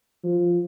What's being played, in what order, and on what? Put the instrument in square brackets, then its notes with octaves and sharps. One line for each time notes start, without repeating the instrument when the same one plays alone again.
[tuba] F3